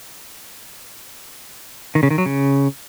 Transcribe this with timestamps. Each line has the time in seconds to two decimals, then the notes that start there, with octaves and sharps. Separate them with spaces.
1.95 D#3
2.03 C#3
2.11 D#3
2.18 F#3
2.26 C#3